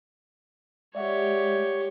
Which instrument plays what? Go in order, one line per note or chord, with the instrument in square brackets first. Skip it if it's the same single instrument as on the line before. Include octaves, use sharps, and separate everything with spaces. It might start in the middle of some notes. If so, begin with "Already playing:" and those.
[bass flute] G#3 [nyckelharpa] G4 C#5 [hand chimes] D5 E5 F#5